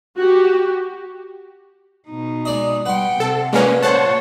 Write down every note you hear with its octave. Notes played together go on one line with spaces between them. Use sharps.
F#4 G4
B2 D#4
G#3 D5 D#5
G3 B4 F#5 G5 C6
C3 A4
A#2 F3 G#3 A#3 C#4 B4
C5 C#5 F#5 A5